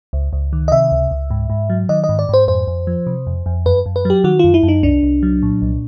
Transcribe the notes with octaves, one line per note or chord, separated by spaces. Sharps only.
C#2
C#2
D#3
D#5
C3 E5
C#2
C#2
G#2
G#2
F#3
D#3 D#5
D#5
G#2
D5
G#2 C5
F2 C5
F2
F3
C3
F2
F2
F#2 B4
F#2
B4
F#3 G4
D#3 F#4
F#2 F4
E4
F#2
D#4
C2 D4
C2
F#3
A#2
C2